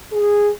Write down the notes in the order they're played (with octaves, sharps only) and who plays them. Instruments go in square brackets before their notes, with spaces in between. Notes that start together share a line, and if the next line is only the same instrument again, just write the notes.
[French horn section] G#4